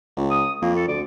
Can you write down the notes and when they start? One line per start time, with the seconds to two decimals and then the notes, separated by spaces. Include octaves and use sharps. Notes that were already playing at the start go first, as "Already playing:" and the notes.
0.17 C#2
0.31 D#6
0.62 F2 A#3
0.76 A4
0.88 D2 D5